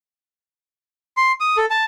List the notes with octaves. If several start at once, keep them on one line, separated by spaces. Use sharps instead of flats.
C6
D#6
A4
A5